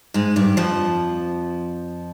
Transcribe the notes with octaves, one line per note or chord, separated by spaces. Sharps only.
G#2 G#3
G2 G3
F2 F3